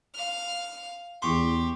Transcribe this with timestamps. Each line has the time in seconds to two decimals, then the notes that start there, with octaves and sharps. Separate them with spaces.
0.14 F5 F6
1.22 E2 G4 C6 C#6